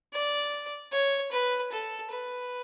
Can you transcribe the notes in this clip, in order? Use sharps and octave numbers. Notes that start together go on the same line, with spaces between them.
D5
C#5
B4
A4
B4